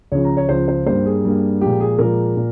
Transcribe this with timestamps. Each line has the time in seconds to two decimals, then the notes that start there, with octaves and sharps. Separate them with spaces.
0.11 C#2 C#3 F3 C#5
0.24 A#5
0.37 C#5
0.49 C#2 C#3 F3 C5
0.68 C5
0.86 G2 G3 A#3 C5
1.06 G#4
1.25 G2 G3 A#3
1.61 A#2 F3 G#3 G4
1.80 G#4
1.99 A#2 F3 G#3 A#4
2.37 A#2